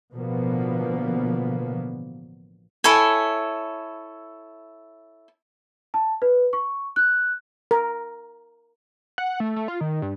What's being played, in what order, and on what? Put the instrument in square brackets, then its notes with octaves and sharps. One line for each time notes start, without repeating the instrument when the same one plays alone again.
[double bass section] A1 B2 D3 F3 A#3 B3
[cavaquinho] E4 A4 C#5 G#5
[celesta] A5
B4
C#6
F#6
[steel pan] A#4
[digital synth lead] F#5
A3
A3
F4
D#3
G2